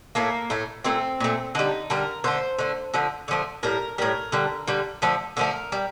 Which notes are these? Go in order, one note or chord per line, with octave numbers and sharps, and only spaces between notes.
A2 A3 A#3
A2 A3
A#2 A3 C4
A#2 A3
D3 G3 D#4
D3 G3 A#4
D3 A3 C5
D3 A3
D3 F3 A3
D3 F3 A3
A2 G3 A#4
A2 G3 A#4
D3 G3
D3 G3
D3 F3 A3
D3 F3 A3 A#4
G3